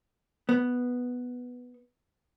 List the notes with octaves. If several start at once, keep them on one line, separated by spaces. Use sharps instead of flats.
B3